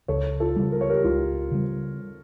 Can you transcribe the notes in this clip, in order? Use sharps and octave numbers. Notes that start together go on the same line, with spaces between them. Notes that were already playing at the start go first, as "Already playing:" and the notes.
C#2 A4 C#5
F4 A4
C#3 G3
A#4
C#5
G4 A#4
C#2 F4
C#3 G3